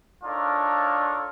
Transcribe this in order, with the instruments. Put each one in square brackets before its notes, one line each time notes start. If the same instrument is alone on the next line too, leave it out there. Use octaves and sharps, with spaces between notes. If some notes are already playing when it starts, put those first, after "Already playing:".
[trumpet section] D4 D#4 F4 A4 A#4 C#5